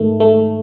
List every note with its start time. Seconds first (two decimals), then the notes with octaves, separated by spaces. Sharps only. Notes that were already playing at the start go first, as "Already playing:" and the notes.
Already playing: G#2 D#3 A3
0.20 A3